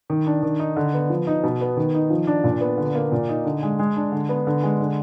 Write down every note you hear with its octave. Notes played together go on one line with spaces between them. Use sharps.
D#3
D4
D#3
D#4
D3
B3
F3
D#4
B2
B3
D#3
D#4
F3
D4
A#2
B3
D3
A#3
A#2
D#4
D3
G#3
G#3
D4
D3
B3
D3
G#3
D3